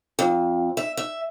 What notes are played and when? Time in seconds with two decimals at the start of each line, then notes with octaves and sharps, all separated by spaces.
0.19 F2
0.77 E5
0.97 E5